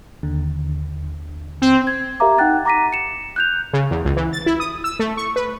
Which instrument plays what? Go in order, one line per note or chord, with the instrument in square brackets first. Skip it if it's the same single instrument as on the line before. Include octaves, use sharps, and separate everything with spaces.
[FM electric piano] D#2 D3
[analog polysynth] C4
[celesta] G#6
G4 A#4 E5 F5 A#5 D6
D#4 F#5 G5 F#6 A6
A#5 D6 A#6 B6 D#7
C#7 E7
F#6 G6 F7
[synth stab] C#3
E2
C#2
E3
A6
E4
D#6
E6
A3
C#6
B4